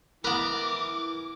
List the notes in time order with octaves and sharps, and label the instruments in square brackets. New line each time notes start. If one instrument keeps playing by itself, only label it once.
[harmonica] E3 [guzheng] B3 B4 [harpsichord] A#4 [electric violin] D6